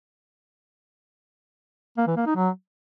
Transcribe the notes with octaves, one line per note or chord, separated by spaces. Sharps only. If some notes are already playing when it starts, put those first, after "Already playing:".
A#3
E3
A#3
D#4
F#3